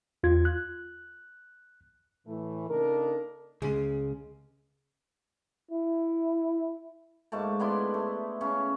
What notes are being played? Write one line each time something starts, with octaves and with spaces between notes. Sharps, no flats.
E2 F4 G#6
F#6
A2 E3 A3
C#3 A#3 D4 D#4 A4 A#4
C#2 C#3 G#3
E4
G#2 A3 A#3 A5
B3 D4 E4 C6
A3
C#3 C#4